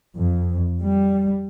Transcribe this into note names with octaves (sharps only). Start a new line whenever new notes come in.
F2
G3